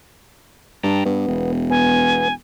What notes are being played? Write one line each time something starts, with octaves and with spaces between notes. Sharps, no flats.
G2 G5 A5 A#5
G2 B3
E1
B3 G#5